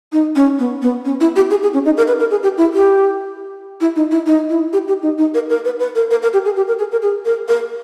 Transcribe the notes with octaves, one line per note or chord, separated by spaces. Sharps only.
D#4
C#4
B3
B3
C#4
E4
G4
G#4
G#4
C#4
D#4
A#4
B4
A#4
G#4
G4
E4
G4
E4
D#4
E4
D#4
E4
G4
G4
D#4
D#4
A#4
A#4
B4
B4
A#4
A#4
A#4
G4
G#4
G4
A#4
G#4
A#4
G#4
A#4
A#4